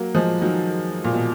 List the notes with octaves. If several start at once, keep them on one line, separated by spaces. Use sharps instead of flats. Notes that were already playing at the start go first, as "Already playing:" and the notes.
Already playing: F#3 A#3
F3 G#3
D#3 F#3
A#2
B2